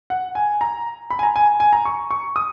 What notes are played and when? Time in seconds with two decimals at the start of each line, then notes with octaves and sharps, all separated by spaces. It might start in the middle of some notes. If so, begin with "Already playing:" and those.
0.10 F#5
0.35 G#5
0.61 A#5
1.10 B5
1.19 G#5
1.23 A#5
1.36 G#5
1.60 G#5
1.73 A#5
1.85 C#6
2.11 C#6
2.36 D#6